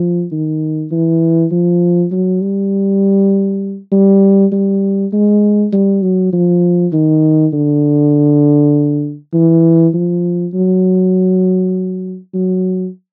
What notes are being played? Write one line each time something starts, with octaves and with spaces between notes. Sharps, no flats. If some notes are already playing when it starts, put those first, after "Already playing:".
Already playing: F3
D#3
E3
F3
F#3
G3
G3
G3
G#3
G3
F#3
F3
D#3
D3
E3
F3
F#3
F#3